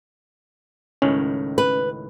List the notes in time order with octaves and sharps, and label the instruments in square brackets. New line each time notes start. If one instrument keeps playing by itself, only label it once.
[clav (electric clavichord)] C#2 A2 D#3 [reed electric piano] C#4
[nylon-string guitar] B4